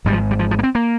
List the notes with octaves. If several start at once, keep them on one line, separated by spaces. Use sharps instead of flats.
G#1 G#2 G3
F3
G3
F3
F3
A#3
C4
A#3